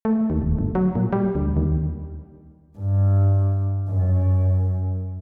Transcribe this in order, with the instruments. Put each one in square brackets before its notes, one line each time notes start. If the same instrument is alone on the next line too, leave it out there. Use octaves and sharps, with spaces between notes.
[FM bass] A3
D#2
D#1
G1
F#3
A#2
G3
D2
D#2
[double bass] G2
F#2